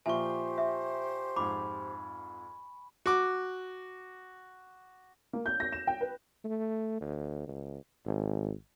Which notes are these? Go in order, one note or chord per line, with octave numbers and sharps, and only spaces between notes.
A#2 F3 G4 C5 E5 G#5 C#6
E5
F2 G#2 B5 D6
F#4 D6
A#3
G6
A#6
E7
G5
B4
A3
D2
C#2
G#1